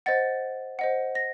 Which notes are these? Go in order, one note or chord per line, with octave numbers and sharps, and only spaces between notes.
C5 D#5 F#5 A6
C5 D#5 F#5
A#6